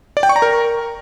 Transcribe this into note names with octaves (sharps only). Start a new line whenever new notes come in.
D5
G5
C#6
A#5
A#4